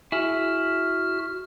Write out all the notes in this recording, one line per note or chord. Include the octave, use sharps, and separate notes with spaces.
E4 F#4 G#4 F6